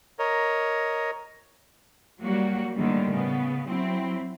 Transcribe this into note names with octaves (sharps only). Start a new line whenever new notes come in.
A#4 C#5 D#5
F#3 G3 A#3 F#4
A2 D3 D#3 G3 A#3
C#3 B3
F#3 C4 E4